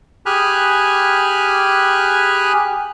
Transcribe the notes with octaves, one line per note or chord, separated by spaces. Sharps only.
G4 G#4 G#5 B5 F6 F#6